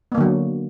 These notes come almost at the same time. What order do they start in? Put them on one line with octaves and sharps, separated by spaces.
B3 A#3 D3 F#3